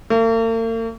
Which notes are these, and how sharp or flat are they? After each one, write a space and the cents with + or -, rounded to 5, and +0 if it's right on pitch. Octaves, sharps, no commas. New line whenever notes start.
A#3 -45